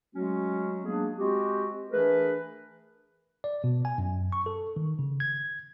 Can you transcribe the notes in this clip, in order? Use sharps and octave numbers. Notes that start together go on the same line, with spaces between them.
F#3 G#3 A3 C#4 F#4
F#3 G#3 A#3 B3 D4 G#4
G#3 C4 F#4 G4
E3 A3 D4 G#4 A#4 B4
D5
B2
G#5
F#2
C#6
A4
D#3
C#3
G#6